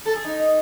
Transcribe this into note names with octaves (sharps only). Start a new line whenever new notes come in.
A4
G#4
D#4